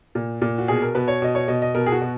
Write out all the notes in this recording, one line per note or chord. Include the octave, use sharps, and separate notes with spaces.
A#2
A#2
F#4
B2 G#4
A#4
B2 B4
C#5
B2 D#5
C#5
B2 D#5
D#5
B2 A#4
G#4
F#4
B2